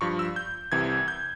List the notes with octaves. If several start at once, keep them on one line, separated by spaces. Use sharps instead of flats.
G2 F3 C#6
E6
G6
C2 C3 E3 G#6
G6